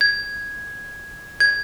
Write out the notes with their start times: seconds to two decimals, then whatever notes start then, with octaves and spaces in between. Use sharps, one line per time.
0.01 G#6
1.40 G#6